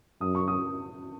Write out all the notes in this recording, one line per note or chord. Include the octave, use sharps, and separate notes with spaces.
F#2 D#6
C#6
D#6